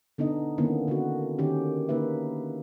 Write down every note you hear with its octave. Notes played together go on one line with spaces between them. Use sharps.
D3 B3 D4 D#4 D#5
D3 D#3 A#3 B3 C#4 E4
D3 D4 F#4
D3 D#3 C#4 G4
D3 A#3 D#4 B4 E5